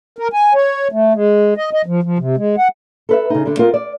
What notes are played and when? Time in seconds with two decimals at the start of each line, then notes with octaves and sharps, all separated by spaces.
0.19 A#4
0.33 G#5
0.54 C#5
0.92 A3
1.13 G#3
1.57 D#5
1.73 D#5
1.86 F3
2.03 F3
2.19 C3
2.37 G#3
2.58 F#5
3.09 A4 B4 E5
3.30 C#3 D#4
3.45 D3 G3
3.59 C4 F4 A#4
3.74 D5